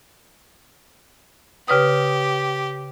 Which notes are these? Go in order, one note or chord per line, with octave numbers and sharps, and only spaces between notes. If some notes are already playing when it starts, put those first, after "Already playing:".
C#3 G4 B4 D#6